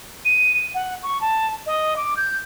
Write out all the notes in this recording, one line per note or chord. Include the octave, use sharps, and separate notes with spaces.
D#7
F#5
C#6
A5
D#5
D6
G6